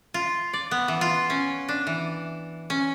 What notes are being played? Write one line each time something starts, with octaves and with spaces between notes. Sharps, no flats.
F4
D5
B3
E3
F4
C#4
D4
E3
C#4